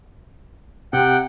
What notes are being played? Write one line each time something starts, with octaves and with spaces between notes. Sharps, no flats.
C3 F#5 G5